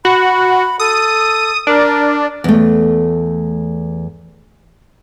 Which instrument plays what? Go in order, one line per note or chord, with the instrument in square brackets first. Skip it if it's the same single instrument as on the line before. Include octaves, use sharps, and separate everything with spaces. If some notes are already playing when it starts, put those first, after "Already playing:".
[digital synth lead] F#4 [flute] B5
[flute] A4 [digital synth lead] D#6
[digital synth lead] D4 [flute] A#4
[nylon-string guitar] E2 A3